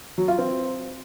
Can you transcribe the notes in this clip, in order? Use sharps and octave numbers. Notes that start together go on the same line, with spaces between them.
F#3
F4
C4